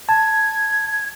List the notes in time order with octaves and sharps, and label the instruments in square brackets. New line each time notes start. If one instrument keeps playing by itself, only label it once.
[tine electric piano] A5 [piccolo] G#6